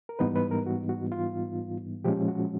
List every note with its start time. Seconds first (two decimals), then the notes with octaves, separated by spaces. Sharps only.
0.09 A#4
0.19 G#2 E3 G3 B3 D#4 B4
0.36 B4
0.51 A#4
0.66 F#4
0.89 F#4
1.12 F4
2.04 A#2 F3 G#3 C#4 G4
2.28 F#4